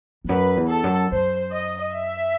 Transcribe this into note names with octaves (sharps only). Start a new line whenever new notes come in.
E2
F#2 B4
E2
A4
F#2
F#2 C5
D#5
E5